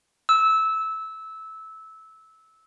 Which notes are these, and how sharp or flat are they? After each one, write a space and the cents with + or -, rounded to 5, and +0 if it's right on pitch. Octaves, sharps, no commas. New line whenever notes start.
E6 -15